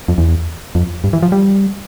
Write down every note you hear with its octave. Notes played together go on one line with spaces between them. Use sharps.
F2
E2
F2
G2
E3
F3
G3